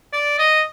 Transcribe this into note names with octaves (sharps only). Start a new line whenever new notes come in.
D5
D#5